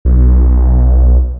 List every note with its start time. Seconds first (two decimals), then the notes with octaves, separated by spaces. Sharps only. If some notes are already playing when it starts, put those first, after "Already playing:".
0.05 B1